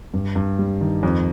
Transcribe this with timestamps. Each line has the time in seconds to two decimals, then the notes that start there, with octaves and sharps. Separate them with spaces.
0.14 G2
0.36 G2
0.59 G3
0.81 D#3
1.03 F2